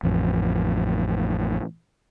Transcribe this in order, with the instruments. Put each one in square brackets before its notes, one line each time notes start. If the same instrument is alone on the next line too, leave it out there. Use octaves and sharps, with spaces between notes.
[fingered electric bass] A1 F2